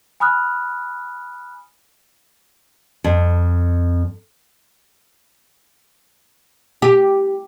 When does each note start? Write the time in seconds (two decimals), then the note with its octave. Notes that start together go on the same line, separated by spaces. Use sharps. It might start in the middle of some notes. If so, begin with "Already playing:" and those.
0.20 G#5 B5 D#6 F6 F#6
3.04 F2
6.82 G4